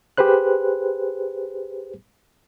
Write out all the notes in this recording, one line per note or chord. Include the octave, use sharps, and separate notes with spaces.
G4 G#4 B4 C5 F#6